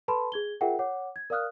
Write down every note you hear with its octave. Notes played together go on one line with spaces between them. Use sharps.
A4 B4 A5 B5 C6
G#4 G#6 G7
F4 G#4 A#4 E5 F#5 G5
C#5 F#5 D6
G#6
A#4 D5 F5 D#6 F6 F#6